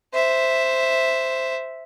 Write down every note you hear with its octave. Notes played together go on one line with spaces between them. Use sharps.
C5 E5